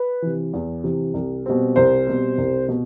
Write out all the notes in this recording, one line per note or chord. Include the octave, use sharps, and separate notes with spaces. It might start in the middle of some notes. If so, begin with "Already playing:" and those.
Already playing: B4
C3 E3
E2
C3 E3
C2
B2 G3 C4
C2 C5
B2 G3 C4
C2
B2